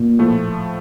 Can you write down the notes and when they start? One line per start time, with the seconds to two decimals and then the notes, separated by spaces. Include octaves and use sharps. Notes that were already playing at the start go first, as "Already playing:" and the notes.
Already playing: A#2
0.19 A2 F3 A3